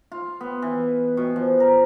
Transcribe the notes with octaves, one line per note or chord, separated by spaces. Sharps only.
F4
B3
E3
B2
F3
A#4